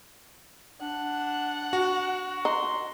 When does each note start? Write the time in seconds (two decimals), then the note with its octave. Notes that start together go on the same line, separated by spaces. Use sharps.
0.81 D4 F#5
1.73 F#4
2.45 D#4 C6